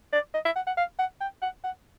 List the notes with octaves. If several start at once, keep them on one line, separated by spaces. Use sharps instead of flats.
D5
D#5
E5
F#5
F#5
F5
F#5
G5
F#5
F#5